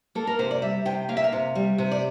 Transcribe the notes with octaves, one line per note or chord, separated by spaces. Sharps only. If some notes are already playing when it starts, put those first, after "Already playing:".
A#3 A4
A#4
C3 C5
D5
G3 E5
C3 G5
A#3 F5
E5
F5
C3
G3
C3
D5